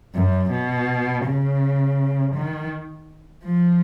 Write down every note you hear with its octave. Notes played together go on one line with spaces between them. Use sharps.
F#2
B2
C#3
D#3
F3